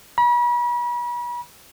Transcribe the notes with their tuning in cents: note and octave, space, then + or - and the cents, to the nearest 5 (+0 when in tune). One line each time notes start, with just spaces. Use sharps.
B5 -40